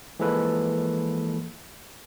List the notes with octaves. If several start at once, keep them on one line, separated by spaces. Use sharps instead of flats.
E3 F3 G#3 A#3 A4 B4